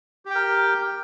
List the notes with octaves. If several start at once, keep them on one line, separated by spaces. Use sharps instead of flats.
G4 A#4 G5